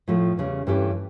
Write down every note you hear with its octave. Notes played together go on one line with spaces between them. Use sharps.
A2 F3 A3
E2 C#3 G3 C#4
G2 E3 A3 C#4 G4